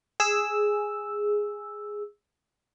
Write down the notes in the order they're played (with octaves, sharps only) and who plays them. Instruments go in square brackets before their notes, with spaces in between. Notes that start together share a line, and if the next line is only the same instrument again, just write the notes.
[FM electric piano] G#4 E6